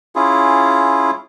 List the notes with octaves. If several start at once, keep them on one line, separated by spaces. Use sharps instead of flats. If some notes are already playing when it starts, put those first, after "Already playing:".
C#4 E4 F4 G#4